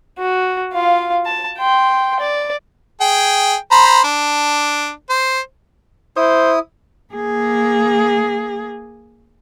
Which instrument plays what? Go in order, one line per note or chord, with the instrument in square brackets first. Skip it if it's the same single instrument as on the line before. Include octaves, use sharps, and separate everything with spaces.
[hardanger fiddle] F#4
F4 F5
A5
G5 C6
D5
[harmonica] G#4 G5
C5 A#5 B5
D4
C5
[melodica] E4 D#6 [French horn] C5
[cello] A#3 G#4